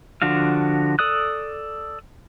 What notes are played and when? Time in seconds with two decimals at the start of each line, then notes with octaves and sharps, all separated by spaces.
0.22 D3 F3 D4 F#4 F5
0.99 A4 D5 D#6 F#6